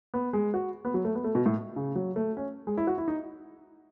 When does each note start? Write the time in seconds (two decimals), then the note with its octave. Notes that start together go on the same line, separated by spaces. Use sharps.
0.14 B3
0.33 G#3
0.54 F#4
0.85 B3
0.94 F#3
1.05 A3
1.15 B3
1.24 A3
1.35 B2
1.46 A2
1.76 C#3
1.95 F#3
2.16 A3
2.37 C#4
2.67 G#3
2.77 E4
2.87 F#4
2.98 E4
3.08 D#4